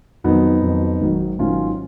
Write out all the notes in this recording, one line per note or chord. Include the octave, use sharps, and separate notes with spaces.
F2 D#3 F#3 B3 D#4
F2 D#3 F#3
G#1 G#2 D#3 F#3
G#1 G#2 D#3 F#3 C#4 F4